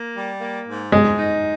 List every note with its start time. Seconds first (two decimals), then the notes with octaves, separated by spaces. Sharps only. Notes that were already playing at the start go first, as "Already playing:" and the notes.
Already playing: A#3
0.16 G3
0.41 A#3
0.67 G#2
0.92 G#2 G#3
1.18 D#4